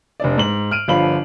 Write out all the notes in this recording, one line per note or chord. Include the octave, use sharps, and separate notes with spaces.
F1 D4 D5
G#2 F#7
F6 D7 D#7
G1 D3 F3 F5 B5 F#7